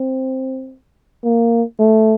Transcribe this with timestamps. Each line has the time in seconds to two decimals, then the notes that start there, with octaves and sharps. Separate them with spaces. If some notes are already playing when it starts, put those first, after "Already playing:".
Already playing: C4
1.24 A#3
1.79 A3